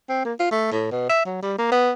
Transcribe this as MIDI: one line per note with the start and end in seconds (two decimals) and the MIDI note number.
0.09 0.24 60
0.25 0.34 58
0.40 0.49 65
0.51 0.69 57
0.72 0.91 45
0.92 1.07 47
1.10 1.26 76
1.26 1.39 54
1.43 1.57 55
1.58 1.67 58
1.72 1.92 59